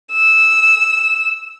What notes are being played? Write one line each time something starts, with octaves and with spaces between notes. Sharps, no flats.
E6